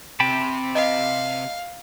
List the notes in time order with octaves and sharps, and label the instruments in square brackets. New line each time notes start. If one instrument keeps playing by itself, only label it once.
[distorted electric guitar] C3 [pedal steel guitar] G5 A5 B5
[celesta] D#5 [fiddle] F5